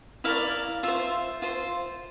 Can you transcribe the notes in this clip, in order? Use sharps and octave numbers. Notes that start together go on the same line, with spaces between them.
E4 A#4 D5 F5
F4 C5 E5
F4 C5